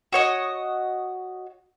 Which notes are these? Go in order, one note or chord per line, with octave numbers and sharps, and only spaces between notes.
F#4 C#5 D#5